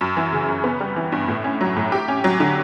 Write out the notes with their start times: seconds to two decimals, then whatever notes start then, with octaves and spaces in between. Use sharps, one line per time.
0.01 F#2
0.17 E3
0.33 C#3
0.49 F#2
0.64 B3
0.80 G3
0.96 E3
1.12 G2
1.28 A2
1.44 C#4
1.61 F#3
1.76 A2
1.92 G4
2.08 C#4
2.24 F#3
2.40 D3